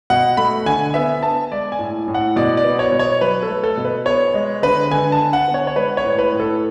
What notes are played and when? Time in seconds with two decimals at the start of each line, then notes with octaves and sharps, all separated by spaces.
0.10 B2 F#5
0.37 A3 B5
0.66 D3 G#5
0.94 B3 E5
1.22 B3 A5
1.52 G#3 D5
1.72 G#5
1.79 A2
2.08 A2
2.14 F#5
2.36 B2 D5
2.57 D5
2.64 B3
2.79 C#5
2.92 B2
2.99 C#5
3.21 F#3 B4
3.43 A4
3.49 A3
3.64 A4
3.77 B2
3.85 B4
4.06 B3 C#5
4.34 G#3
4.62 D3 B4
4.91 D3 G#5
5.12 A5
5.19 D3
5.33 F#5
5.48 B3
5.54 C#5
5.67 C#5
5.76 G#3 B4
5.97 C#5
6.04 A2
6.19 B4
6.33 A2
6.40 A4